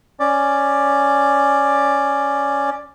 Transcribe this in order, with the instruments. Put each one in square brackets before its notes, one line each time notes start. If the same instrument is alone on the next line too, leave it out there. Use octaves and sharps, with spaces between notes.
[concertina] C#4 D5